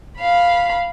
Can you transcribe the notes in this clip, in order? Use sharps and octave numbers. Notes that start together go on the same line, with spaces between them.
F5 B5